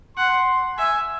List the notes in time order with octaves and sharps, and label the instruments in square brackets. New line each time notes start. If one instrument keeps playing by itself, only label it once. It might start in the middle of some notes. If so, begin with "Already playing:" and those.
[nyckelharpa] F#5 [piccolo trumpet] C6
[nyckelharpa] E5 [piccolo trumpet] G#5